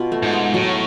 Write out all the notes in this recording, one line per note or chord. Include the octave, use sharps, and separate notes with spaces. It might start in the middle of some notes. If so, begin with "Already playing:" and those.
Already playing: B2 F4
A3
G#2
G#4
A2 F#3